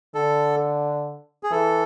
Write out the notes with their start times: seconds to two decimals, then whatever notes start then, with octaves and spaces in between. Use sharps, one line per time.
0.15 D3 A4
1.43 G#4
1.51 E3 A4